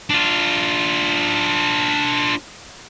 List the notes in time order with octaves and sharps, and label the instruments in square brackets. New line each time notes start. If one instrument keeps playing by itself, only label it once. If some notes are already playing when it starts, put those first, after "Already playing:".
[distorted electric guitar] D4 F4